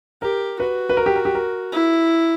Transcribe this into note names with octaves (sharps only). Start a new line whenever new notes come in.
G4 A#4
F#4 B4
B4
A#4
G4
A#4
G4
A#4
E4